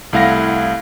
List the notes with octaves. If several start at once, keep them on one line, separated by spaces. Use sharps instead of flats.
C2 A3 E4 F5 F#5 A#6